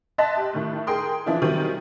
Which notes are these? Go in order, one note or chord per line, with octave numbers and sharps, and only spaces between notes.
D#5 E5 A5 C6 F#6 A6
G4
A2 D#3 A3
G#4 A#4 G5 C6 D#6
E3 F3 D4 E4
D#3 F#3 G3 C4 E4 D#7